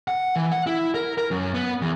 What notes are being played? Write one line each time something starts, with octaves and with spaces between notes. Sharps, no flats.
F#5
E3
F#5
E4
A#4
A#4
F#2
B3
E2